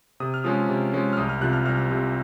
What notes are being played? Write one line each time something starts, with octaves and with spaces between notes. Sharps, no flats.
C3 D#6
F6
F3 G#3 C#4 D#6
C3
F3 G#3 C#4
F6
C2 D#6
F6
C3 F3 C4 F#6
F6
C2 F6
C3 F3 C4